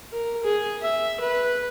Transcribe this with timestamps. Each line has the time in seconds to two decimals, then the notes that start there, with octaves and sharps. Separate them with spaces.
0.12 A#4
0.43 G#4
0.82 E5
1.20 B4